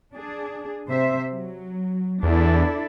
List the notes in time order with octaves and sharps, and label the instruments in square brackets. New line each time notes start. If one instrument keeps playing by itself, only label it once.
[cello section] D4 G#4
C3 C5 E5
F#3
[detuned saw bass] E2 [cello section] D4 E4 A4